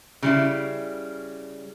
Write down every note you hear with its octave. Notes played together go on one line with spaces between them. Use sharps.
C#3 G3 E4